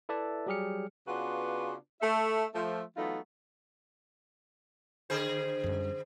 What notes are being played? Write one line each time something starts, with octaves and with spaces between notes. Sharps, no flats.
E4 A4 B4 D5 E5 A5
F#3 G3 G4 G#4 F6 C#7
C#3 B3 D4 F4 F#4 B4
A3 E5
F3 A3
E3 F#3 A3 B3 D#4 F4
D3 G#4 C5
F#2 G3